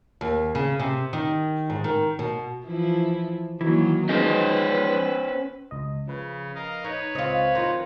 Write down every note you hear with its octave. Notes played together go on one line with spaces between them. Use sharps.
D#2
C#3
C3
D#3
G#2
D#3
B2
E3 F3 E4
D#3 E3 F#3 A#3
F3 G#3 C#4 D#4 B4 C5
C#2 D#5
C#3 F3 B4
A#4 D#5 F5
D#4 B4 C#5
C#2 C4 F4 D#5 C#6
D#3 F3 C5 A#5